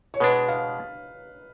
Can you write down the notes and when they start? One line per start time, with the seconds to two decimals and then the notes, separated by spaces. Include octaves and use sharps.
0.14 C#5
0.20 B2 G#3 D4 B4
0.49 F5